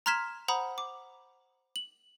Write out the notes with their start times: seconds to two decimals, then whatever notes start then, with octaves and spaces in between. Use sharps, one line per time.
0.06 A#5 C6 F6 G#6 B6 E7
0.48 C5 F#5 A#5 B5 D#6
0.78 D6
1.76 F#7